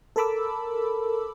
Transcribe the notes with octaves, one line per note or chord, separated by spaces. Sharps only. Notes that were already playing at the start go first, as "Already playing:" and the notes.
A4 A#4 A5 B5 D6 E6